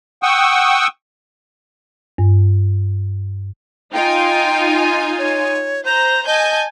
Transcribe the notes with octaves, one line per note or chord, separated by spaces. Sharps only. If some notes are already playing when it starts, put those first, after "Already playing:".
F#5 G5 C#6 D#6 E6
G2
D#4 F4 G5 G#5
C#5
C5 A#5 G6
D#5 G#5 A5 G6